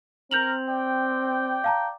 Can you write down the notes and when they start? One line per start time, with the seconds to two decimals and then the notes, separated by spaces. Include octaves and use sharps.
0.31 C4 A#4 G6 F7 F#7
0.66 D5 G5
1.64 F5 A5 A#5